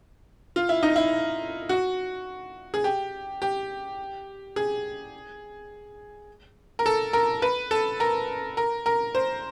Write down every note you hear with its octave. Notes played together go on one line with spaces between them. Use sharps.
F4
E4
D#4
E4
F#4
G#4
G4
G4
G#4
A#4
A4
A#4
B4
A4
A#4
A#4
A#4
C5